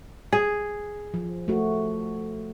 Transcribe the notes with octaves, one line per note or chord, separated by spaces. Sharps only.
G#4
F3
A3 F#4